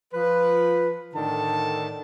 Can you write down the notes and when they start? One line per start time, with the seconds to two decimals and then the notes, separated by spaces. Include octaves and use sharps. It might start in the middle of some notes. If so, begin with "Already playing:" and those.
0.13 F3 B4
1.14 A2 D3 D#3 A5